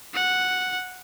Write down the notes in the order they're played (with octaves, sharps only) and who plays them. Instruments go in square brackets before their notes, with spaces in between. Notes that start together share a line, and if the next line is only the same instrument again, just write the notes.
[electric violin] F#5